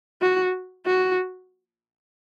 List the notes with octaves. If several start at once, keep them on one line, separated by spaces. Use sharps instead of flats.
F#4
F#4